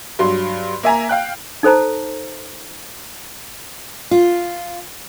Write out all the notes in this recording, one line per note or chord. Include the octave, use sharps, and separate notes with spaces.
G2 F#3 C6
A#3 E5 G#5 A#5
F5 G5 F#6
D#4 A4 C5 A5 A#5
F4